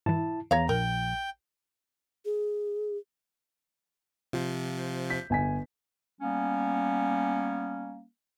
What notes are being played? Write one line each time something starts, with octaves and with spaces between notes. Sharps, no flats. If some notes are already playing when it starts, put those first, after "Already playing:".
G#2 B2 E3 E4 A5
E2 F3 C#5 F5 A#5
A#1 A#4 G5
G#4
C3 F3 F4
G6 B6
G1 G#5 B6
G3 A#3 B3 C#4